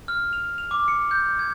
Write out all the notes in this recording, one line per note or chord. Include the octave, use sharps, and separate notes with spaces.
F6
F7
F7
D6
C#7
G6
G#6